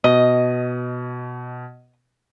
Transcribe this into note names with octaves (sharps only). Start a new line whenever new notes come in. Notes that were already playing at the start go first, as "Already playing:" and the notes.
B2 D#5 D#7